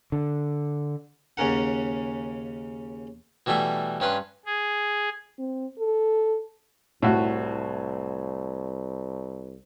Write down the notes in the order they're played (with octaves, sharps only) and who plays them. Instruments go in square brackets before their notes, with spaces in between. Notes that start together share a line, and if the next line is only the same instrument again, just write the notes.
[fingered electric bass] D3
[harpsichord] D#2 C#3 C#4 A#4 F#5
B2 E3 G3 A3 E5
G2 C#4 B4 C6
[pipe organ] G#4
[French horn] C4
A4
[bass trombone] C2 [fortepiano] A2 F#4